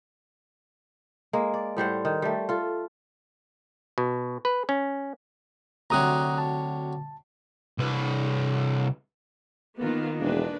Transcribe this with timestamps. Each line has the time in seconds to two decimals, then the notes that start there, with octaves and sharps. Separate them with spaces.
1.33 G#3 A#3
1.54 D5
1.77 A2 G3 C5 F#5
2.05 D#3
2.22 G3 A3
2.49 F4 A4
3.98 B2
4.45 B4
4.69 C#4
5.90 D2 C3 F#3 A#5 D#6 F#6
6.38 A5
7.79 C2 B4
9.79 D#3 A#3 B3 F4
10.20 E1 D4 G#4 B4